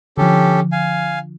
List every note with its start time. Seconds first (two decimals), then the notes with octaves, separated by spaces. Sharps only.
0.18 D3 F3 C#4 G4 A4
0.72 F5 G#5